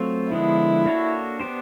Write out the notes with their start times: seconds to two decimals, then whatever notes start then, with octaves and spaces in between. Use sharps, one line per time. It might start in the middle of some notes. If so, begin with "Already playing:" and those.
Already playing: F#3 A3 C4 F4
0.31 D3 F3 G#3 B3 D4 E4
0.85 A#3 D4 F#4 A4 C#5
1.39 B3 D4 G4 C5